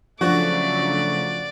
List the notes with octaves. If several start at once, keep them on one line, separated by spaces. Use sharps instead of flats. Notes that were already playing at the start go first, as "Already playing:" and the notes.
C#3 F3 F#3 A3 D4 F#4 D5